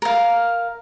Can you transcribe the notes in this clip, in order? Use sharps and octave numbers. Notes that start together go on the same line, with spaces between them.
A#4 F5